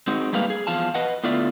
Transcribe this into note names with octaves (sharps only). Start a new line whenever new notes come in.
G#3 C4 D#4 F#4
G3 A3 A#3 G4 B4 F5
G#4
E2 F3 F5 A5
B4 D#5 F#5
A2 D3 B3 F4 D5 E5